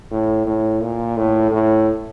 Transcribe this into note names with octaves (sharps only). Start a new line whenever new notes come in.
A2
A2
A#2
A2
A2